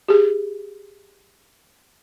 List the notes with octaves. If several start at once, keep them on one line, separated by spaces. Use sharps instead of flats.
G4 G#4